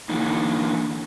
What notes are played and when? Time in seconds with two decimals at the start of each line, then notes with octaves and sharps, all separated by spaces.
0.09 D3 E3 A#3 D#4